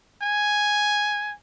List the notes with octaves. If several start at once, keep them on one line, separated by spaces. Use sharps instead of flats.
G#5